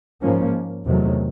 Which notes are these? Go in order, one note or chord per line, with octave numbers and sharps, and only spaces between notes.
G#2 F3 A#3 C#4
E2 C3 D#3 F#3 A3